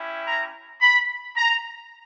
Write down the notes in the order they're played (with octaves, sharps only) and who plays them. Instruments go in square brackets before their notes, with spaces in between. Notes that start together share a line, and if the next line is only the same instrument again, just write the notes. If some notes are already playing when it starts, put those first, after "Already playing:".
Already playing: [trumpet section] C#4 E4 G4
A#5
B5
A#5